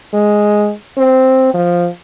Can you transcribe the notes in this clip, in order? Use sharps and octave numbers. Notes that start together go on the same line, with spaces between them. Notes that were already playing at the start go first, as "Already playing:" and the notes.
G#3
C4
F3